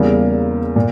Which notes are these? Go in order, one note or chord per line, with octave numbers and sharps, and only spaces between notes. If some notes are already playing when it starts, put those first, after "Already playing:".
Already playing: E2 C#3 G3 A#3
A#2